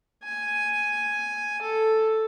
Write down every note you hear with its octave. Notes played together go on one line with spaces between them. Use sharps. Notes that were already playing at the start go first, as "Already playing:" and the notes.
G#5
A4